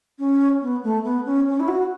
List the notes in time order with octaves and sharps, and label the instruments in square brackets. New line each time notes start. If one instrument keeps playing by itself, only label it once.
[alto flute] C#4
B3
A3
B3
C#4
C#4
E4
F#4